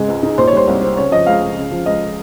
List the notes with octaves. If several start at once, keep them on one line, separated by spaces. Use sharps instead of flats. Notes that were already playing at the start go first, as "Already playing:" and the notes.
Already playing: G#2 C#3 G#3
C#2
D#4
A#2 C5
C#5
G3 C5
C2
C4
C#3 C#5
F3 D#5
C#2 F5
C#2
C#3
F3
C#2 D#5